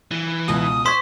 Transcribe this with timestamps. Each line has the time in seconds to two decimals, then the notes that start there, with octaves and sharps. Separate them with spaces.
0.11 E3
0.48 C#2 B2 D#6
0.86 C5 C6 C#6 D#6 G#6 B6